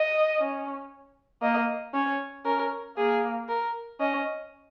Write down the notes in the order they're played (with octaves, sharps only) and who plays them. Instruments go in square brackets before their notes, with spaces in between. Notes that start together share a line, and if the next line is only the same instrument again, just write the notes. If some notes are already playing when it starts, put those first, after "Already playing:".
Already playing: [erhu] D#5
[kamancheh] C#4
[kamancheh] A#3 [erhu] D#5
[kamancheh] C#4 [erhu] C#5
[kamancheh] C#4 [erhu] A#4
[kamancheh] A#3 [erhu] G#4
[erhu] A#4
[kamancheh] C#4 [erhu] D#5